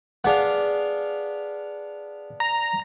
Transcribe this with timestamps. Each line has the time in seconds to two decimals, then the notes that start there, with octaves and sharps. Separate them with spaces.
0.24 B3 D4 G#4 F5 F#5
2.40 A#5